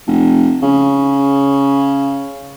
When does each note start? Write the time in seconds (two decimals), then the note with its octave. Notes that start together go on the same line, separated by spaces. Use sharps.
0.07 F1
0.63 C#3